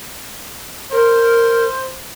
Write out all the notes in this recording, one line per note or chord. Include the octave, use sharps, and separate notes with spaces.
A#4 C5